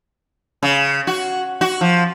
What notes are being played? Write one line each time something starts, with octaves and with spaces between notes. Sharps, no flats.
C#3
F#4
F#4
F3